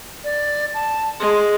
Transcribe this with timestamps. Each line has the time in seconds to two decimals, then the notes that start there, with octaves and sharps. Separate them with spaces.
0.24 D5
0.74 A5
1.20 G#3 C6